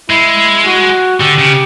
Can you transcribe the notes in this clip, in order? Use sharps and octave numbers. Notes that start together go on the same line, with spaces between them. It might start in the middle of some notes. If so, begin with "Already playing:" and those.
G#3 E4
F#4
D3 G4
C#3